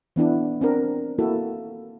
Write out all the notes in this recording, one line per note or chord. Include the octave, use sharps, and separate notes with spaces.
E3 B3 D4 E4
C4 D4 A#4
A#3 E4 F#4 A4